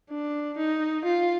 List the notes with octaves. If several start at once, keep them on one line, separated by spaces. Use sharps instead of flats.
D4
D#4
F4